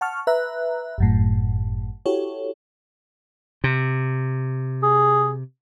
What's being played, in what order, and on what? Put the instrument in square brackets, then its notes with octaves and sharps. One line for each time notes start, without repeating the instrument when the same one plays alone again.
[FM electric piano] F#5 A5 C#6 F6
B4 E5 A#5 F#6
G1 F#2 A2
E4 F#4 G4 A4 C#5
[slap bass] C3
[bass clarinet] G#4